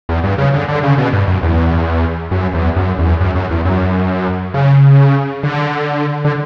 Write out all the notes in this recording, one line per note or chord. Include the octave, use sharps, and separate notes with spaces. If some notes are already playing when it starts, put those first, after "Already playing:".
E2
G2
C#3
D3
D3
C#3
B2
G2
F#2
E2
F#2
E2
F#2
E2
F#2
F#2
E2
F#2
C#3
D3
D3